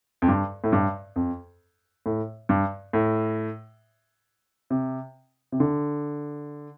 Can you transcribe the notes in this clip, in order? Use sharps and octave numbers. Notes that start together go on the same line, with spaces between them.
F2
G2
A2
G2
F2
A2
G2
A2
C3
C3
D3